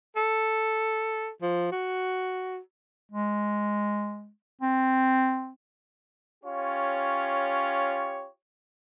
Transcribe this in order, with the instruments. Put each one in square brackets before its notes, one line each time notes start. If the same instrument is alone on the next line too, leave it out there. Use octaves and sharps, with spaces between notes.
[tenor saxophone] A4
F3
F#4
[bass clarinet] G#3
C4
[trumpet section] C#4 F4 G4 C#5